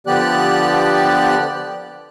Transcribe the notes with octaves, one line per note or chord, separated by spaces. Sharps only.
D3 F3 B3 G4 D5 F#6